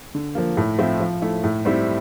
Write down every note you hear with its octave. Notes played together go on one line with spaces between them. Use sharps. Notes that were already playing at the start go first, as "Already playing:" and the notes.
D3
F3 A#3
A2
F3 C4 E4
F3
A3 E4
A2
G3 C4 E4